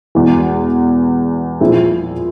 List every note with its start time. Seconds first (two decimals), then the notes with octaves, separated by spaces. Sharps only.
0.15 E1 E2 E3
1.61 A#2 F3 C4 E4 G#4